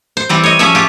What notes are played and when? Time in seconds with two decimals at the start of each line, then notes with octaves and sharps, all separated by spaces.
0.17 C5
0.29 E3 G3 C4
0.43 C#5 D#5
0.59 F3 C#4 G#4 C#5 E5
0.75 F4 G4